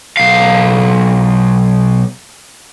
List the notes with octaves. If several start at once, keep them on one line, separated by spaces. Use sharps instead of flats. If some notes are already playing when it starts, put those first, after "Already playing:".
B1 F5